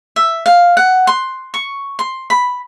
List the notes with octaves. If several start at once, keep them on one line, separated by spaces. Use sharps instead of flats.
E5
F5
F#5
C6
C#6
C6
B5